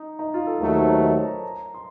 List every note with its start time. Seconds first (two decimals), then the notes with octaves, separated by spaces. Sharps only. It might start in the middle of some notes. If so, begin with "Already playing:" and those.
Already playing: D#4
0.19 D#4
0.34 F4
0.47 A4
0.61 D#2 D#3 F#3 A3 A#4
0.74 C5
0.89 C#5
1.02 D#5
1.17 A5
1.22 A#5
1.43 A#5
1.74 C6